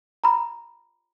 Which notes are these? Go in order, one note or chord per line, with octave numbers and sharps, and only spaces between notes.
A#5 B5